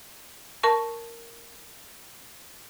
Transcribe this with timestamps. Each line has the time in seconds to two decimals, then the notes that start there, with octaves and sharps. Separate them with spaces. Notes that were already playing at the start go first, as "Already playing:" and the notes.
0.63 A#4 A5 C#6